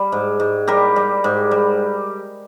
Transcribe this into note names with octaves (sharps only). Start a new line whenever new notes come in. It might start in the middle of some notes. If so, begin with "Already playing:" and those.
Already playing: G3
G#2
G#2
G3 G4 A#4
G3
G#2
G3